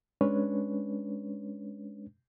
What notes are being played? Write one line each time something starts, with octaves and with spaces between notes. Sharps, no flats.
G#3 C#4 D4 B4 C#5